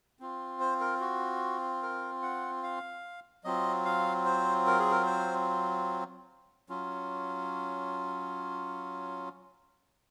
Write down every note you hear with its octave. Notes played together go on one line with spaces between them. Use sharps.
C4 F4
C5
A#4
F#4
A#4
F#5
F5
F#3 C4 F4 D#5
F5
C5
A#4
G#4
A#4
C5
F#3 C#4 F4